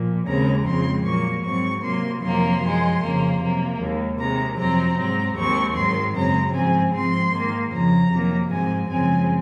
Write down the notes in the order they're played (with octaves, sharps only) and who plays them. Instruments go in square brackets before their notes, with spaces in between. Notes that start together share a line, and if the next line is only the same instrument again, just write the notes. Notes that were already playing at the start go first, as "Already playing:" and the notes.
Already playing: [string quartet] A#2 F3
D#2 C#3 G#3 C4 A#5
F2 C#3 F3 G#3 C4 C6
A#2 F#3 A#3 C#6
G#2 F#3 C4 C#6
C3 F#3 A#3 C6
F2 C3 D#3 F#3 A#3 C6
F#2 F3 G#3
F2 C#3 F3 A#3
C3 F#3 A#3
D#2 D#3 G#3
C3 D#3 G#3 A#5
F2 C3 F#3 C4 A#5
G#2 F#3 C4 A#5
D#2 D#3 G#3 C4 C#6
G#2 D#3 F#3 C6
F#2 C#3 G#3 C4 A#5
G#2 F3 C4 G#5
G#2 F3 G#3 C4 C6
G#2 D#3 A#3
F2 C#3 F3 A#5
F2 C3 D#3 F#3 A#3
G#2 F3 G#3 C4 G#5
F#2 C#3 F3 G#3 C4 G#5